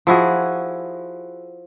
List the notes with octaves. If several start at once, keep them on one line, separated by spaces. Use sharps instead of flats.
F3 E4 F#4 G#4